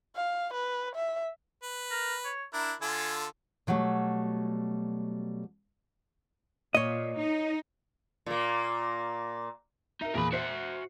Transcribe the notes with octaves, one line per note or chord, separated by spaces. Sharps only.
F5
B4
E5
B4
A#4
C#5
D4 E4 A#4
D3 F4 A4 G#5
B2 F#3 G3 A3
A#2 C#5 D#5
D#4
A#2 A#3
D#4 A#4 E5
E2 A#2 G#4 A#4 B5
F#4 C5 E5 C7